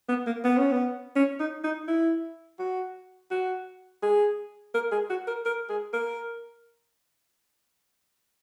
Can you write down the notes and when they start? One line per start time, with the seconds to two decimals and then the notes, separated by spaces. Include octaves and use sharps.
0.09 B3
0.26 A#3
0.44 B3
0.58 C#4
0.72 B3
1.16 C#4
1.40 D#4
1.64 D#4
1.88 E4
2.59 F#4
3.31 F#4
4.02 G#4
4.74 A#4
4.92 G#4
5.10 F#4
5.27 A#4
5.46 A#4
5.69 G#4
5.93 A#4